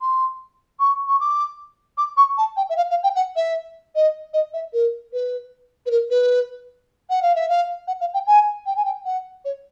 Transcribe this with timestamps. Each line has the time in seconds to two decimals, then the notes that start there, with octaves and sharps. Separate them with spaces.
0.01 C6
0.80 C#6
1.07 C#6
1.20 D6
1.97 D6
2.17 C#6
2.37 A5
2.56 G5
2.69 E5
2.77 F5
2.90 F5
3.03 G5
3.15 F#5
3.36 E5
3.95 D#5
4.33 D#5
4.53 E5
4.73 A#4
5.13 B4
5.86 B4
5.90 A#4
6.10 B4
7.10 F#5
7.22 F5
7.35 E5
7.49 F5
7.87 F#5
8.00 F5
8.14 G5
8.27 G#5
8.66 G5
8.76 G#5
8.85 G5
9.05 F#5
9.45 C#5